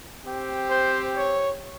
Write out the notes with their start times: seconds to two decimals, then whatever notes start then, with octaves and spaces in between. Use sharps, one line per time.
0.24 C4 G4
0.71 C5
1.17 C#5